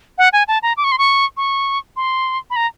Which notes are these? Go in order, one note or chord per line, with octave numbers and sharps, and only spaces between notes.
F#5
G#5
A5
A#5
D6
C#6
C6
C#6
C#6
C6
B5
A#5